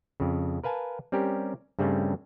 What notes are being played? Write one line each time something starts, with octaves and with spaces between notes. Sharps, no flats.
F2 C#3
A#4 B4 F5 G#5 A5
G3 C4 C#4 G4 A#4
G2 C#3 G3 A3 C4 C#4